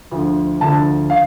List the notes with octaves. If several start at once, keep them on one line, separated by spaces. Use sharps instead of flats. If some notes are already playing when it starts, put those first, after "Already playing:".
D2 D3 F3
D2 D3 F3 A5
F5